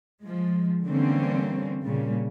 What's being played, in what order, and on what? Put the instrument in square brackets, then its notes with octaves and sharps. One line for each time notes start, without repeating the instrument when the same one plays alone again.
[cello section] F3 G#3
D3 E3 G3 A#3 C4 C#4
A#2 C#3 G3